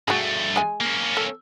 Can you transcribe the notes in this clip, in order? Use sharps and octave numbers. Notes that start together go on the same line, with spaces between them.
G2 A3 F#4 G#4
G#3 G#5
A#3 C#4
A4